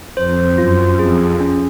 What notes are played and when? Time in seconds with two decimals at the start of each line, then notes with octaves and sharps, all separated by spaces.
0.17 F2 C5
0.58 F#2 F4
0.99 F2 G#4
1.40 C#4